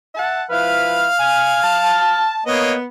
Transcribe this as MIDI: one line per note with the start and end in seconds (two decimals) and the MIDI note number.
0.15 0.41 76
0.15 0.41 78
0.15 0.41 81
0.49 1.07 53
0.49 1.07 64
0.49 1.07 71
0.49 2.34 77
0.49 2.34 89
1.18 1.61 80
1.63 2.40 81
2.46 2.74 58
2.46 2.84 59
2.46 2.74 73
2.46 2.74 75